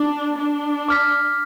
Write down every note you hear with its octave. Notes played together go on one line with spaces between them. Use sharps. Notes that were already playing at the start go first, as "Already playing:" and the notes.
Already playing: D4
D4
D6 F6 B6